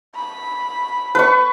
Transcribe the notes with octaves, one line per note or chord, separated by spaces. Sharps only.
B5
B4 C#6